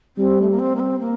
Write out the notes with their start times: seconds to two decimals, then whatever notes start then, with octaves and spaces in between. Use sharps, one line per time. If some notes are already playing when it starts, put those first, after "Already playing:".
0.17 G3 C4
0.41 A3
0.51 A#3
0.59 C4
0.76 A#3
0.80 C4
1.00 A#3